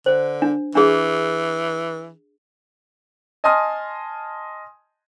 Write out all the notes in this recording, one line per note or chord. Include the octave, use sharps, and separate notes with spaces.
D3 C5
D4
E3 D4 G#4
D#5 G#5 A5 C6 D#6 F6